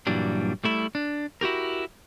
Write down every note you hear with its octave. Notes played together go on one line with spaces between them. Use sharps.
G2 A#2 E3 F#3 G3 D4
G3 A3 E4
D4
E4 F#4 G4 A#4